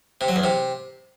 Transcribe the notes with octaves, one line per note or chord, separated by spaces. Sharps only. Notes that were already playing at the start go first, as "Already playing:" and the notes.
C3
F#3
E2
C3